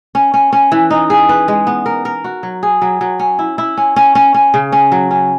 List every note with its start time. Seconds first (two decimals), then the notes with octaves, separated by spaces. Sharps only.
0.15 C#4
0.34 C#4
0.53 C#4
0.72 E3
0.90 D#4
1.10 G#4
1.29 B4
1.48 G#3
1.67 B3
1.86 A#4
2.05 A#4
2.24 F#4
2.43 F#3
2.63 G#4
2.82 F#3
3.01 F#3
3.20 C#4
3.39 E4
3.58 E4
3.77 C#4
3.96 C#4
4.15 C#4
4.34 C#4
4.54 C#3
4.72 C#4
4.92 F#3
5.11 C#4